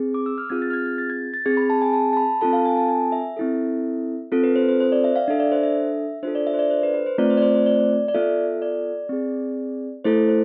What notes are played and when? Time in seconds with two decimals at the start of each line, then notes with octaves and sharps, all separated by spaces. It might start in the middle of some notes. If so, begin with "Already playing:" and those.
Already playing: C4 G#4
0.14 D6
0.26 E6
0.38 F6
0.50 C4 F4 G#4 G#6
0.62 A6
0.70 F6
0.73 G#6
0.86 G#6
0.98 A6
1.10 G#6
1.34 A6
1.46 C4 G#4 G#6
1.57 B5
1.70 A5
1.82 G#5
1.93 A5
2.13 A5
2.17 B5
2.41 C4 F4 A4 A5
2.53 F5
2.65 G#5
2.77 A5
2.88 G#5
3.12 E5
3.37 C4 E4 A4
4.32 C4 F4 A4
4.44 B4
4.56 C5
4.69 C5
4.80 C5
4.92 D5
5.04 E5
5.16 F5
5.28 D4 A4 E5
5.40 D5
5.52 C5
5.63 E5
6.23 D4 F4 A4 C5
6.35 D5
6.47 E5
6.54 C5
6.59 D5
6.70 C5
6.83 B4
6.94 B4
7.06 C5
7.18 A3 C4 F4 D5
7.30 C5
7.37 D5
7.42 C5
7.55 C5
7.66 D5
8.08 D5
8.14 B3 F4 A4 E5
8.62 D5
9.09 C4 G#4
10.05 A3 E4 A4 C5
10.29 C5